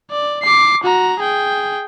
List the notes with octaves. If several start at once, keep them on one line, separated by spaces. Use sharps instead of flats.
D5
D6 C7
F#4 A#5
G#4 G5